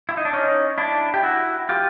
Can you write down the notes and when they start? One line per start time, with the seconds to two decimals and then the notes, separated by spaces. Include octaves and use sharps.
0.09 E4
0.17 D#4
0.25 D4
0.33 C#4 D#4
0.78 D4 E4
1.14 G4
1.23 E4 F#4
1.69 F4 G4